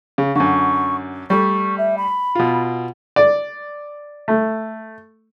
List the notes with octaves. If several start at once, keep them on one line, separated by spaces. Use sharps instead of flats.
C#3
F#2 D3 C#6
G3 A3 C#6
E5
B5
B2 F4
D5
A3